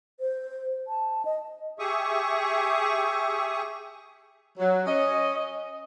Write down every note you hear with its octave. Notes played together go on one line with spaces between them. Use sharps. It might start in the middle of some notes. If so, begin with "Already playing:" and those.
C5
A5
D#5
G4 G#4 E5 C#6 D#6
F#3
C#4 D#5